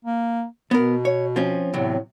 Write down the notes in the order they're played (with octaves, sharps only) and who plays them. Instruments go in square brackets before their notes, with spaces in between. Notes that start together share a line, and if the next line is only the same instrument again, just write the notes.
[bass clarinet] A#3
[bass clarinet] B2 [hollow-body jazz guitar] B3 A#4
[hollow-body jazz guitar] C#5
F3 C4 C#4
[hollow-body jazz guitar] E2 C3 F#3 [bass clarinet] A2